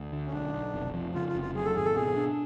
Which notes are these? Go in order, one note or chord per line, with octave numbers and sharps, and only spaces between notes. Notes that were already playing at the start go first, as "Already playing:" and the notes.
Already playing: D2
D3
C#4
B1 D4
B1
F1
F3
C#3 F4
F4
F1
F4
F#3 G#4
A4
G#1 G#4
A4
B2 G#4
D4